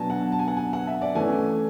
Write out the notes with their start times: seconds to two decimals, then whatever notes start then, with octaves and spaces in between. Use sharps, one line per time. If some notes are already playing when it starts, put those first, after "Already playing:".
Already playing: B2 F#3 B3 D4 G#5 A5
0.10 F#5
0.32 A5
0.39 G#5
0.48 F#5
0.57 G#5
0.73 F#5
0.87 E5
1.02 D5
1.15 E3 A3 C#4 G#5